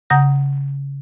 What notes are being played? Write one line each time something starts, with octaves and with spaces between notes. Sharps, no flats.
C#3 F#5 A#5 D#6 G6 A#6